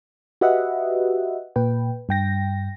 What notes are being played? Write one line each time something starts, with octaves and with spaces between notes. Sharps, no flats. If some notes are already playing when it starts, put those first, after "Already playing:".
F#4 G4 B4 D#5 E5 F#5
A#2 B4 G5
G2 G5 A#6